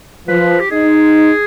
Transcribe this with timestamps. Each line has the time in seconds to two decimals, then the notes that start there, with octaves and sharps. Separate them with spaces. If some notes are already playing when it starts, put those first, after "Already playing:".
0.28 F3 B4
0.60 G4
0.71 D#4 G#4